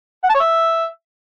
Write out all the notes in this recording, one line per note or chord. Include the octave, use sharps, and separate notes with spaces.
F#5
A5
C#5
E5